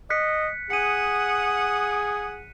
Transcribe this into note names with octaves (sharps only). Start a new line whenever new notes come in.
D#5 F#6 B6 C#7
G#4 F#5 D#6 C#7 D#7